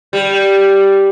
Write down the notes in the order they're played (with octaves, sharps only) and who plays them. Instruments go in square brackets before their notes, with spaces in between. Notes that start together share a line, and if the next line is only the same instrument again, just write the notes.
[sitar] G3